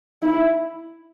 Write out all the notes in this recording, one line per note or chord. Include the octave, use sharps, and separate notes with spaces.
E4